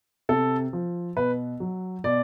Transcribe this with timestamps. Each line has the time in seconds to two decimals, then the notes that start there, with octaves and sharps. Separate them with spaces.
0.29 C3 A4
0.73 F3
1.17 B2 B4
1.60 F#3
2.04 B2 D5